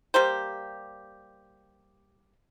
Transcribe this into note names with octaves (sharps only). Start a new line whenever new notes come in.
G3 A#3 G4 C5